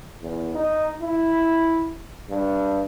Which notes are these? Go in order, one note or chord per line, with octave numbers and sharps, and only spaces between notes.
E2
D#4
E4
G2